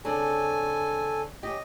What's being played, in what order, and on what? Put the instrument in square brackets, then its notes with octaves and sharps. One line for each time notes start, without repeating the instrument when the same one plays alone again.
[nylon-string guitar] C#3 C4 D4 [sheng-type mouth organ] A4 G#5
[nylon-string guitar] C#4 G4 [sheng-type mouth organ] D#5